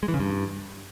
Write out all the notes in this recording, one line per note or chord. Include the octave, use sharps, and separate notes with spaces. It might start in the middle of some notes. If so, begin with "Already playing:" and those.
G#3
E3
C#3
G2